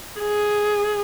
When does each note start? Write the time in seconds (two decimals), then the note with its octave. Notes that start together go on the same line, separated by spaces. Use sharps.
0.20 G#4